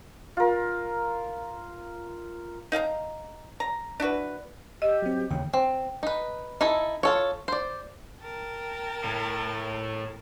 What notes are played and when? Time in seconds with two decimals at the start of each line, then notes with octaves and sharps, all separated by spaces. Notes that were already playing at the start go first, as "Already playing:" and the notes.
0.37 F4 A#4
2.72 D#4 F5 F#5 A#5
3.60 A#5
4.00 D4 E4 F#4 B4
4.82 G4 D#5 E6
5.02 F#3 C4
5.31 D#2 C#3 G5
5.53 C4
6.03 D#4 B4
6.61 D#4 E4 A4
7.03 F4 A4 C#5
7.48 C5 D5
8.21 A#4 G5 A5
9.04 A2